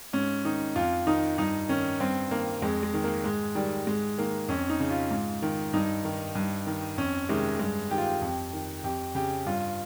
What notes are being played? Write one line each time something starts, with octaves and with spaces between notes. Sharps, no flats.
G#2 C#4
D#3 D#4
F2 F4
D#3 D#4
G2 D#4
D#3 C#4
G2 C4
D#3 A#3
F2 G#3
G#3
D#3
A#3
G#2 G#3
D#3 G3
G#2 G#3
D#3 A#3
F2 C#4
D#4
C#3
F4
G#2
D#3
G2 D#4
D#3
G2
D#3
F2 C#4
C3 D#3 G#3
G2 G#3
D#3 G4
F4
G4
F2
D#3
F2 G4
C#3 G4
G2 F4